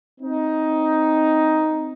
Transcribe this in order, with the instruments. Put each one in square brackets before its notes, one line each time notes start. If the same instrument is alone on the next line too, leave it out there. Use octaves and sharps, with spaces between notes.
[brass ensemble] C4 D#4